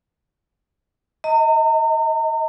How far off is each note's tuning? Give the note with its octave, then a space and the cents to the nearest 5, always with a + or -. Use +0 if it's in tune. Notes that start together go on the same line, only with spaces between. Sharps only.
D#5 +25 A#5 -40